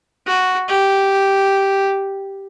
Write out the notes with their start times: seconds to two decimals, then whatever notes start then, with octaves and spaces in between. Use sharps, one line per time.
0.27 F#4
0.68 G4